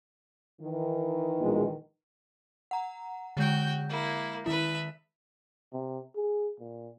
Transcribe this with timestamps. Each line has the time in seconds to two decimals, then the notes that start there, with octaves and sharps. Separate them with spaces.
0.61 D#3 E3
1.40 A#1 B2 G#3
2.71 F#5 A#5
3.37 D3 G#3 F#4 G5 G6
3.89 A#3 E4
4.46 D#3 E4 B4 E5
5.73 C3
6.16 G#4
6.60 A#2